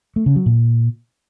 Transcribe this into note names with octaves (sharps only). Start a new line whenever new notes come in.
A3
C#3
F#3
A#2